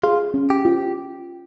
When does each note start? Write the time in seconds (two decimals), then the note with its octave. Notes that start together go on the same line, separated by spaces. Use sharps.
0.03 F4 G#4
0.34 C#4
0.50 G4
0.65 F4